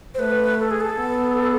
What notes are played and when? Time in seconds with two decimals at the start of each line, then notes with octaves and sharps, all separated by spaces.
0.14 C5
0.19 A3 B4
0.60 A4
0.71 G#4
0.80 A4
0.99 B3